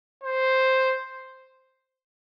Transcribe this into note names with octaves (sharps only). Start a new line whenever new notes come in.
C5